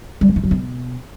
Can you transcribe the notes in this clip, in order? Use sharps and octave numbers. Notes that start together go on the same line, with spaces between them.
G3
B2
D#3
F#3
B2